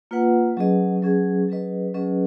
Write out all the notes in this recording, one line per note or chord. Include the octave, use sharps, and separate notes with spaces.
A#3 F4 B4 F#5
F#3 C#4 G#4 B4 D#5
F#3 C#4 G#4 B4 D#5
F#3 C#4 G#4 B4 D#5
F#3 C#4 G#4 B4 D#5